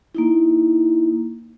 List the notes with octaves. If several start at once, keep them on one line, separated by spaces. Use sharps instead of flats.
A#3 D#4 E4